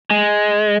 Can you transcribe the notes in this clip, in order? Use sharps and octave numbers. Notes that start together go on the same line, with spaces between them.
G#3